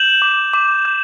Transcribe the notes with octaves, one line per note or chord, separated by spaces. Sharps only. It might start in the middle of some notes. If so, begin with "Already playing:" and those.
Already playing: G6 E7 F#7
D6
D6
G6